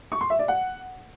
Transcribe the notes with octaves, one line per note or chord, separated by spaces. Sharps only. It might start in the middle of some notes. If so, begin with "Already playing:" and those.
C#6
C6
E5
D5
F#5